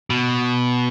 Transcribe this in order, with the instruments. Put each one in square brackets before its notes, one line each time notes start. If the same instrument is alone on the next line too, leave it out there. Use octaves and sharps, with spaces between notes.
[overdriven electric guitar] B2